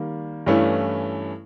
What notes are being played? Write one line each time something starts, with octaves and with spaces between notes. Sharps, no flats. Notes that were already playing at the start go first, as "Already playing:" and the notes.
Already playing: D#3 G3 A#3
G2 E3 A3 C#4 E4